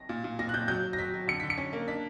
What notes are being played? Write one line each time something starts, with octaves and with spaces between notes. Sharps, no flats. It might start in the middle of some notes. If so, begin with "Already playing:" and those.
Already playing: A#6
A#2
A#2
A#2 A#6
F#6
A#2 G6
F#3 G6
F#3
A#6
F#3 B6
F#3
D3 C#7
D3 B6
C#7
C#4
A#3
D4 B6